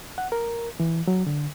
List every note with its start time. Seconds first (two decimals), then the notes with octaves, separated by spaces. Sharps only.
0.18 F#5
0.32 A#4
0.80 E3
1.07 F#3
1.26 D3